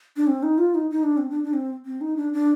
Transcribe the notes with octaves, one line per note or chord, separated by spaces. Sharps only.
D4
C4
D#4
F4
D#4
D#4
D4
C4
D4
D4
C4
C4
D#4
D4
D4